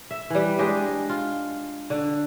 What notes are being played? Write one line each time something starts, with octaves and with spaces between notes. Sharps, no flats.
E5
E3 G3
G#3 D4 G4 D#5
F4
D3